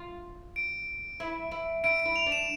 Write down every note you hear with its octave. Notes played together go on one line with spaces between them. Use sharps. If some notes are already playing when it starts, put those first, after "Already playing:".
Already playing: F4
D7
E4
E4
E4 D7
D7
E4
F7
D4
E7